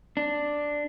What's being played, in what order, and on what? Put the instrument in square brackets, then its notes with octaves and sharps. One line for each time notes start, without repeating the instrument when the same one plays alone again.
[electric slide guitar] D4